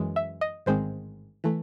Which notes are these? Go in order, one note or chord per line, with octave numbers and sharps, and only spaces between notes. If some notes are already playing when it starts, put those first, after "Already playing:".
Already playing: F#2 E3 G#3
E5
D#5
A1 G#2 D#3 G#3 C4 C5
E3 A3